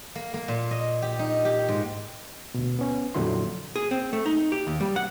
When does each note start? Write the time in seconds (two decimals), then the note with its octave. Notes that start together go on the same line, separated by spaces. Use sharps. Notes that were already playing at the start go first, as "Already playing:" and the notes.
0.15 A#3
0.34 A#3
0.48 A#2
0.71 D#5
1.02 G4
1.19 D#4
1.45 G4
1.68 G#2
2.54 D2 B2
2.79 B3 C#4
3.14 F2 A#2 D3 F#3 E4 C6
3.76 G#4
3.91 C4
4.13 A3
4.26 D#4
4.52 G4
4.67 D#2
4.81 G3
4.96 F#5